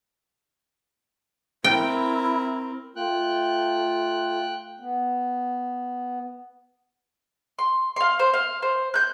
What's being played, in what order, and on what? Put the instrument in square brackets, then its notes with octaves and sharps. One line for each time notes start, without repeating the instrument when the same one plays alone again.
[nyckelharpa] C4 A#4 [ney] E4 [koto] G5
[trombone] A3 [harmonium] F4 [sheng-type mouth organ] G5 F#6
[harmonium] B3
[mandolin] C6
F5 C6
C5
F5
C5
F#6 G6